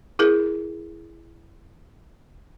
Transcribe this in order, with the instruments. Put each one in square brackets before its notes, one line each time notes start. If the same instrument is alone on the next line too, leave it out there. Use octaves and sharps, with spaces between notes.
[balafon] E4 G#4 A#4